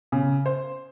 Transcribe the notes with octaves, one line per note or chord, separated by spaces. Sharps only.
C#3
C5